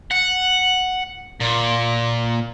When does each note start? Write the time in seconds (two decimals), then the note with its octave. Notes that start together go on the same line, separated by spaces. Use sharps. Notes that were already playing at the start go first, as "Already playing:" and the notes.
0.11 F#5
1.40 A#2